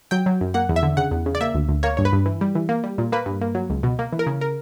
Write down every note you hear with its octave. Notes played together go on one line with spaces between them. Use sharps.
F#3 G5
F#3
F#2
A#3 F#5
E2
E5
D3
C#3 F#5
E2
C#3
D5
A#3 E5
D2
D2
A#3 C#5
G2 C#5
B4
G2
E3
G3
E3
A#3
G3
A#2
A#3 B4
G2
A#3
F#3
C#2
B2
A#3
E3
A#4
C#3
A#4